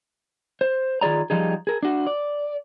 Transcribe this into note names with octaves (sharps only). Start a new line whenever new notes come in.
C5
D#3 F4 G#4 D5 A#5
F3 G3 D#4 G#4
G#4 A#4
D4 F#4
D5